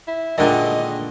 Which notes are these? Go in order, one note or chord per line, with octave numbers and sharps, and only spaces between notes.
E4
A#2 D3 D#3 G#3 A4 D#5